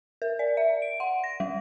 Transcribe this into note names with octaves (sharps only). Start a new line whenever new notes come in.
A#4
D5
E5
D7
F#5
A#6
G3